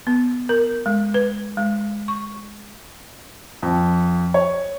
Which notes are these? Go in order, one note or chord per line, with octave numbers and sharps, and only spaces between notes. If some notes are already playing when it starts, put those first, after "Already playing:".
B3
A#4
G#3
B4
G#3
C#6
F2
C#5